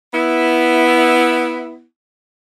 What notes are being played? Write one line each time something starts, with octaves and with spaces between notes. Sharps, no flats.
B3 E4